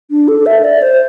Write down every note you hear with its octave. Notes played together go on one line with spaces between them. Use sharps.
D4
A4
E5
D5
C5